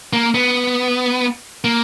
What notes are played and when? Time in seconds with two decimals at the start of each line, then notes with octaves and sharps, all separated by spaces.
0.13 A#3
0.35 B3
1.64 A#3